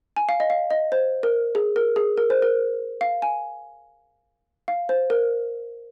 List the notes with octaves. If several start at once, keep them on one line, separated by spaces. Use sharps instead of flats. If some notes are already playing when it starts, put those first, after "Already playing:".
G#5
F5
D#5
F5
D#5
C5
A#4
G#4
A#4
G#4
A#4
C5
A#4
F5
G#5
F5
C5
A#4